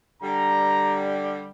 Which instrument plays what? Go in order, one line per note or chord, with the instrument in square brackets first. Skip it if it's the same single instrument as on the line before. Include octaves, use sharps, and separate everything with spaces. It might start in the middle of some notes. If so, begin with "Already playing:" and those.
[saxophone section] D3 G3 [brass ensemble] A#5